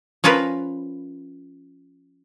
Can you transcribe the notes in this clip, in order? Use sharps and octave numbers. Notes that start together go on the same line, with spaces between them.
F3 C#4 F4 A#4 B4